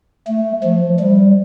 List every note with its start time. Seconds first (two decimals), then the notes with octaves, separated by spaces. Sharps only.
0.27 A3
0.64 F3
1.00 G3